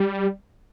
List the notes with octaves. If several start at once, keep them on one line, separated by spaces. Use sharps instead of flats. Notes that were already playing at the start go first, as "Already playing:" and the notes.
Already playing: G3